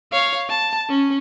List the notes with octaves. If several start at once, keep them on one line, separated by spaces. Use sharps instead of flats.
C#5 F5
A5
C#4